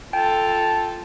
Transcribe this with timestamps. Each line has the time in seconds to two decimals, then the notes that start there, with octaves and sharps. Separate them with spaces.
0.13 F4 A4 G5 A5